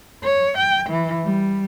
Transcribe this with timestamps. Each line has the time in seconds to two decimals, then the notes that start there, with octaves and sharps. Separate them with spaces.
0.23 C#5
0.57 G5
0.90 E3
1.24 G3